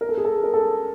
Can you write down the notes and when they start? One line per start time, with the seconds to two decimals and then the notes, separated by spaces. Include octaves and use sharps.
0.01 A#4
0.09 A4
0.17 G#4
0.25 A4
0.43 A#4
0.54 A4